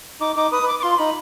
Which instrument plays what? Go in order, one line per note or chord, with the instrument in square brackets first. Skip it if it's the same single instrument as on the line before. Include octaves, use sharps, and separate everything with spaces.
[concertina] D#4 [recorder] D6
[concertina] D#4 [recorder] D6
[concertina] B4 [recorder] D#6
[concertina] B4
[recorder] D6
D6
[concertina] F4 [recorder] C6
[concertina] D#4 [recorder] B5